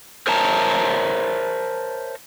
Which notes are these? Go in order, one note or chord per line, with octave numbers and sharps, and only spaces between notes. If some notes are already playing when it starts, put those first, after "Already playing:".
A#4 C5 C#5 E5 A5 A#5